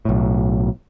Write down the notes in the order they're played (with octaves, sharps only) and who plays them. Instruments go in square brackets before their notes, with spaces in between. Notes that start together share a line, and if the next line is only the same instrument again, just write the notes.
[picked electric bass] B1 A2